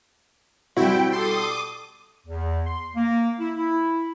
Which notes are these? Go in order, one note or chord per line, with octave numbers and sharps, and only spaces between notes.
B2 G3 C4 E4 F#4 G5
A4 C6 D6 D#6
E2
C6
A#3
E4
E4